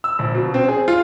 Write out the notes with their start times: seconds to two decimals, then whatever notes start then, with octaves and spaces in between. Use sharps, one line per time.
0.04 E6
0.19 A#1
0.34 B2
0.54 C4
0.68 G#4
0.88 F4